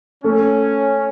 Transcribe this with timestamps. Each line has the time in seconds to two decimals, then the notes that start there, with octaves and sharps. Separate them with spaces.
0.24 A3 C#4